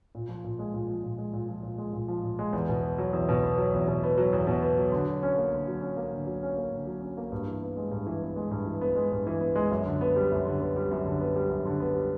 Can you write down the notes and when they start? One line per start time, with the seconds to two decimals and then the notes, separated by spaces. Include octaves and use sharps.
0.15 A#2
0.28 F3
0.44 A#2
0.59 G#3
0.74 A#2
0.89 F3
1.04 A#2
1.18 G#3
1.33 A#2
1.49 F3
1.63 A#2
1.78 G#3
1.93 A#2
2.08 F3
2.23 A#2
2.39 G#3
2.53 E2
2.69 B2
2.83 B3
2.98 F#3
3.13 E2
3.29 B2
3.43 B3
3.58 F#3
3.74 E2
3.88 B2
4.03 B3
4.18 F#3
4.33 E2
4.47 B2
4.62 B3
4.77 F#3
4.92 D3
5.08 F#3
5.23 C#4
5.38 A#3
5.53 D3
5.68 F#3
5.82 C#4
5.97 A#3
6.12 D3
6.27 F#3
6.43 C#4
6.57 A#3
6.72 D3
6.87 F#3
7.02 C#4
7.17 A#3
7.32 G2
7.47 E3
7.62 B3
7.77 G#3
7.91 G2
8.07 E3
8.22 B3
8.36 G#3
8.51 G2
8.66 E3
8.81 B3
8.96 G#3
9.12 G2
9.27 E3
9.41 B3
9.56 G#3
9.71 F#2
9.86 D3
10.01 B3
10.16 G3
10.31 F#2
10.45 D3
10.60 B3
10.76 G3
10.91 F#2
11.06 D3
11.20 B3
11.36 G3
11.50 F#2
11.65 D3
11.80 B3
11.95 G3